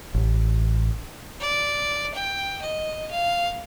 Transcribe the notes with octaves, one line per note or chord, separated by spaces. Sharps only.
A1
D5
G5
D#5
F5